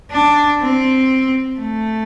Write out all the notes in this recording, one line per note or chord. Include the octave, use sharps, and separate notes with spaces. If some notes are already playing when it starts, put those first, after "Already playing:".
D4
C4
A3